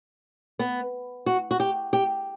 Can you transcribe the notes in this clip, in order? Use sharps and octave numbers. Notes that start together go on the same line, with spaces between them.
B3
F#4
F#4
G4
G4